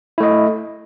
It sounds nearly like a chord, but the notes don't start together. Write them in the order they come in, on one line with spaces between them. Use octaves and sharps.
E4 A3 D#5